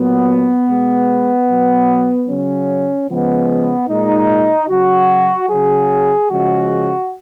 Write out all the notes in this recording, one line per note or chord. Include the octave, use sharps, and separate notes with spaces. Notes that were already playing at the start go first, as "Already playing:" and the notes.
Already playing: A#2 F#3 B3
B2 G#3
B2 F#3
C#3 F#3 C#4
C#3 F3 G#3 B3
A#2 G#3 D#4
C#3 F#3 F#4
C#3 F#3 G#4
C#3 F3 G#3 F#4